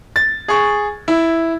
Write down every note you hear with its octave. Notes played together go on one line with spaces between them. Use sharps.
A6
G#4 C#6
E4